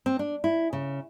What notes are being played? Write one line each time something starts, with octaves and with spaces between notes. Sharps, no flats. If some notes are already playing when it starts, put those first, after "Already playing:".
C4
D4
E4
C#3